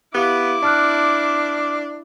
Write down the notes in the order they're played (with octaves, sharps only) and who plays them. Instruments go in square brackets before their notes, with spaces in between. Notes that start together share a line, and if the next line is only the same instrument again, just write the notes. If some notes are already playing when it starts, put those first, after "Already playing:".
[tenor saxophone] B3 [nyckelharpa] E4 D6 [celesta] G4 F5
[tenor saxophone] D4 [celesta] A5 F6 F#6